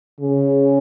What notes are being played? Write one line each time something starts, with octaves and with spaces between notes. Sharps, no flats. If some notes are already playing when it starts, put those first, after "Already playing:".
C#3